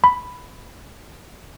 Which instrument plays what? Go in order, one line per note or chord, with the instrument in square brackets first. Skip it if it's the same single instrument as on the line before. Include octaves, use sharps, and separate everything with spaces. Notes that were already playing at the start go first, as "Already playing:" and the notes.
[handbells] B5